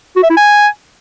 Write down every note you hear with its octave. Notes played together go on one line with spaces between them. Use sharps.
F#4
E5
E4
G#5